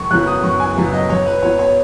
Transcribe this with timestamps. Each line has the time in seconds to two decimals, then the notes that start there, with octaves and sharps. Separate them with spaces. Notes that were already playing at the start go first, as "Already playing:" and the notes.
Already playing: F#1 C#6
0.11 F#2 C#3 F#3 B3 F#6
0.27 D#6
0.43 F#1 C#6
0.60 G#5
0.77 F#2 C#3 F#3 B3
0.94 D#5
1.10 F#2 C#5
1.26 B4
1.43 F#3 B3 C#5
1.59 C#5